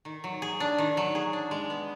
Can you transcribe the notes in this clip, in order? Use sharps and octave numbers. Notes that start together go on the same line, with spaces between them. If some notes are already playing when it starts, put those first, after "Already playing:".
D#3
F#3
G#4
D4
D#3
F#3
G#4
D4
G#3
B3